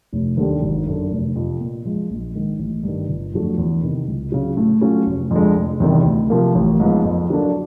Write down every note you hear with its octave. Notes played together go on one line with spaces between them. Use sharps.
F1
D#2 D3 G3
G#1
F#2 D3
F1
F2 C3 F3
A#2
F3 G#3
A#1
G#2 D#3
A1
G2 D#3
G1
F2 D3 F#3 A3
E2
C3 D#3
C#2
C#3 F#3
A2
F#3 A3 C#4 F4
F1
F2 D3 F3 G#3
F1
E2 C3 D#3 G3
D2
C3 F3 A#3
A1
G#2 F3 G#3 B3
F2
D3 F#3 A#3 D4